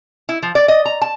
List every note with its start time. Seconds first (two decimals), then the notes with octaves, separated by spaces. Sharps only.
0.29 E4
0.42 F3
0.55 D5
0.68 D#5
0.85 A#5
1.02 A5